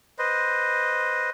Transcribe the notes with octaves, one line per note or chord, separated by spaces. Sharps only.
B4 C5 D#5